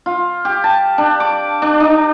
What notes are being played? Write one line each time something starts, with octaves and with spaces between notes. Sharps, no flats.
F4
G4
A5
D4
D6
D4
D4